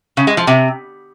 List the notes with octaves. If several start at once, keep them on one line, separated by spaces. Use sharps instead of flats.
C#3
G#3
F3
C3